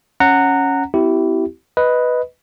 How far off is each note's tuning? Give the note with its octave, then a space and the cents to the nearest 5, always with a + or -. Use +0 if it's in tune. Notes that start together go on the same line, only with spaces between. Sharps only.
C#4 +0 F#5 +0 A#5 -20
C4 -40 E4 +0 G4 -25
B4 +0 D#5 +10